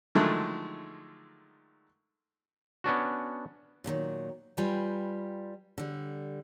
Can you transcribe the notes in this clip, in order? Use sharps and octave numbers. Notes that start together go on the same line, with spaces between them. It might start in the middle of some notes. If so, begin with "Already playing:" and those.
D3 D#3 F3 F#3 G#3 A3
B3 C#4 D4 F#4
A#2 D3 D#3 F#3
G3 F4 B4 G5 G#5 A#5
D3 G3